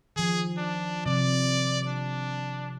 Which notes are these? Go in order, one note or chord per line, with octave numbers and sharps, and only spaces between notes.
D#3 F3 G#4
D4
C3 F3 D5
D4